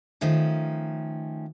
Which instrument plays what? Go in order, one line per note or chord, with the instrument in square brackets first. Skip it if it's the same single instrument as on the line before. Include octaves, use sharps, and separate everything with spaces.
[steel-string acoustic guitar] D#3 F3 A3 C#4